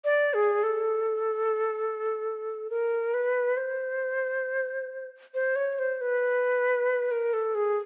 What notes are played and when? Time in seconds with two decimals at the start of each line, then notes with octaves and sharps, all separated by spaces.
0.05 D5
0.34 G#4
0.63 A4
2.70 A#4
3.14 B4
3.57 C5
5.34 C5
5.56 C#5
5.79 C5
6.01 B4
7.11 A#4
7.33 A4
7.55 G#4